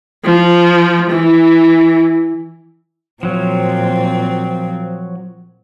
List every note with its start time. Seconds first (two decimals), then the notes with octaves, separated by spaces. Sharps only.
0.25 F3
1.10 E3
3.23 A#2 F3 F#3 C4